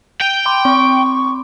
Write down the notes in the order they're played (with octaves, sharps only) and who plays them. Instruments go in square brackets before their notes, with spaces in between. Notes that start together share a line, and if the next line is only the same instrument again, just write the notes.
[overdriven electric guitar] G5 [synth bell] D#7 F7
[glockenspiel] B5 C6 D6
[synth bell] C4 [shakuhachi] C#6